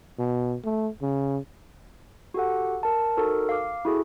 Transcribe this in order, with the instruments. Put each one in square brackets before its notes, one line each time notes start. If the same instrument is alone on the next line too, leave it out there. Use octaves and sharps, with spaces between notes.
[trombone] B2
A3
C#3
[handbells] F#4 G4 A4 F#5
A#4 A5
D#4 F#4 A4 A#4 C5
F5 D6
E4 F#4 G#4 A4